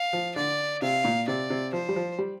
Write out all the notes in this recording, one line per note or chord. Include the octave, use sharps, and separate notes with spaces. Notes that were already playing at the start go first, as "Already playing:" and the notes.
Already playing: F5
F3
D3 D5
C3 F5
A#2
C3 D5
C3
F3 C5
G3
F3
G3